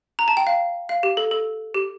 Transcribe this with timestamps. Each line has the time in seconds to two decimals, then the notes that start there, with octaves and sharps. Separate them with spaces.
0.19 A#5
0.28 A5
0.37 G5
0.47 F5
0.89 F5
1.03 G4
1.17 A4
1.31 A4
1.74 G4